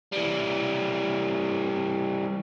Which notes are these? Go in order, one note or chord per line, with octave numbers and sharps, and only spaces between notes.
E3 G3